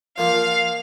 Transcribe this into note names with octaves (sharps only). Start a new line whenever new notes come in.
F3 A#3 F4 F5